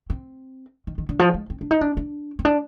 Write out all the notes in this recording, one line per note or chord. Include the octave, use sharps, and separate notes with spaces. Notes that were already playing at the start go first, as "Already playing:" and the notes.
C4
D#3
D#3
D3
F3
G#3
C4
D4
D#4
D4
D4
C4
D4